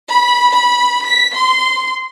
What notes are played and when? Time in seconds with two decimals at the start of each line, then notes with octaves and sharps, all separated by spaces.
0.11 B5
0.51 B5
1.07 B6
1.35 C6